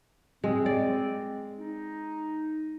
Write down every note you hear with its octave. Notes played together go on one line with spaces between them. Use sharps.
G#3 C4
D5
D#4